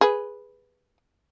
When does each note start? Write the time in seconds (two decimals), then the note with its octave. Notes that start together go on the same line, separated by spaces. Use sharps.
0.01 G#4 B4